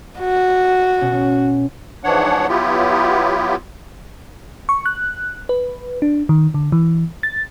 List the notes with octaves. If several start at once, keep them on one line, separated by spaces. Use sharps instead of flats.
F#4
B2 C#4
G#2 E3 F3 D4 C#5 F#5
F#3 B3 E4 F4 G4
C#6
F#6
B4
D4
D#3
D3
E3
A6